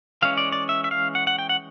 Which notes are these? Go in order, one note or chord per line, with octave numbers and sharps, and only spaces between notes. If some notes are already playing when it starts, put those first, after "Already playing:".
E3 G#3 C#4 F5
D5
D5
E5
E5
F5
F#5
F#5
G5
F#5